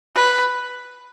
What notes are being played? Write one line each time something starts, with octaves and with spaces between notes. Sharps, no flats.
B4